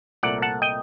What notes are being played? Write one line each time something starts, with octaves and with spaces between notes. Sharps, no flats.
C2 A#2 A3 D5 F#5
F#5 A5
D#5 G5